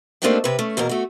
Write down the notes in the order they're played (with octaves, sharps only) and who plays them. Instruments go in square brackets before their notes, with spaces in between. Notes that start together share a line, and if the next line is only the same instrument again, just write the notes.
[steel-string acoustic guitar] A3 A#3 C4 D4 D#4 G4
C3 B4
A3 C#4
E2 B2 A#3 A#4
A3 F#4